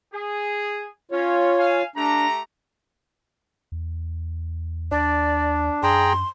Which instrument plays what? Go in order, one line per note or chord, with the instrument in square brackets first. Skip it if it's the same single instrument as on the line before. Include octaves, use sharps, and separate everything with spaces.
[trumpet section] G#4
[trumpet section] C#4 F5 [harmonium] F4 C#5
[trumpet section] F5 G#5
[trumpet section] A3 G4 A#5 [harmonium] D4
[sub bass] E2
[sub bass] D#2 [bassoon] D4 [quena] D5
[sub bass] F#2 [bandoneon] G#4 G5 A#5 [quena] C6